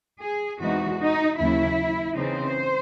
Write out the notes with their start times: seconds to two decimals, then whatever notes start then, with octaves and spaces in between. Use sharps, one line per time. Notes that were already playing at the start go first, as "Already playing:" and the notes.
0.21 G#4
0.60 E2 C3 E3 G#3 D#4 F#4
0.99 D#4
1.38 D#2 C#3 F#3 E4
2.17 C#3 E3 C4 D#4 C5